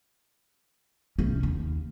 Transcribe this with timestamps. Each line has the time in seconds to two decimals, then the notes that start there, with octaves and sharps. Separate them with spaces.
1.19 C2 C#4
1.43 D#2